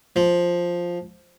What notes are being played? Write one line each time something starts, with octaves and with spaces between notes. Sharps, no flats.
F3